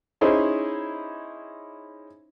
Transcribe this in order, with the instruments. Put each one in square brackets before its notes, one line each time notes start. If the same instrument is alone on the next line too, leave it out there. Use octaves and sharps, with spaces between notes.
[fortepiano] C#4 D#4 E4 G#4 C5